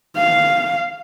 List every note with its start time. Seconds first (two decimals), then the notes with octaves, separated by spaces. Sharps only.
0.17 F5